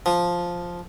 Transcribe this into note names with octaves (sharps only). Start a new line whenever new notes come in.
F3